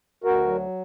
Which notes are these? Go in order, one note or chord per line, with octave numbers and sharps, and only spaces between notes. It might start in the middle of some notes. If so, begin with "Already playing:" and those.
D2 F#4 A#4
F#3